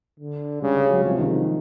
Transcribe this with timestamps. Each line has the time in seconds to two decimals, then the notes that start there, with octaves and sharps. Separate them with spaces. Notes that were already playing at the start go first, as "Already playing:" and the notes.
0.20 D3
0.62 C#3 G3 G4
0.76 G#3 G#4
0.90 F#3 F#4
1.04 C3 F3 F4
1.18 D#3 D#4